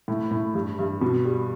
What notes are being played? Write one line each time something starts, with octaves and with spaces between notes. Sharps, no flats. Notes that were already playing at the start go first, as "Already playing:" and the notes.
A2
A2
G2
G2
B2
G3